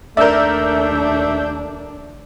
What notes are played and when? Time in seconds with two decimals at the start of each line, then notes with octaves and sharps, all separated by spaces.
0.17 D#2 A3 D4 A#4 D5 E5 E6 G6